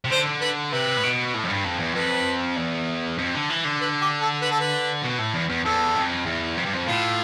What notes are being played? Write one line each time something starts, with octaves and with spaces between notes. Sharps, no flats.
C3
D3 C5
B4
C3 B4
A2
B2
A2
F2
G2
F2
E2
F2 B4
E2
F2
D3
E3
D3
B4
G4
A4
B4
A4
B4
B2
A2
E2
E2
E2 A4
F2
E2
F2
G2
F2
A2 F4